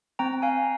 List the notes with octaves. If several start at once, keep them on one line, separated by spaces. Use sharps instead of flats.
C4 G5 A#5
F5 G#5